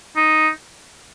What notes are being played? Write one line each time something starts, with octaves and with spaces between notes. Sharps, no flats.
D#4